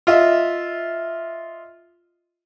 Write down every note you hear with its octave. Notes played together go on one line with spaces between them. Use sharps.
F4 D#5 E5